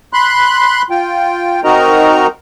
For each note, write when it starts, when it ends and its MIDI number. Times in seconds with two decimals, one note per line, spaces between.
0.13 0.82 83
0.13 0.82 84
0.13 0.82 90
0.90 1.61 65
0.90 1.61 79
1.64 2.27 60
1.64 2.27 63
1.64 2.27 66
1.64 2.27 70
1.64 2.27 75
1.64 2.27 82